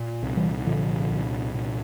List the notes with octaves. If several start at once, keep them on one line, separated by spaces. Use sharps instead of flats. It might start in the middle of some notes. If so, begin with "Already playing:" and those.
Already playing: A#2
C2
E3 G3
A#2 D3 F3
C2
A#2